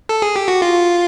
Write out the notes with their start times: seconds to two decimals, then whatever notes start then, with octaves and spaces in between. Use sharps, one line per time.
0.09 A4
0.22 G#4
0.36 G4
0.48 F#4
0.62 F4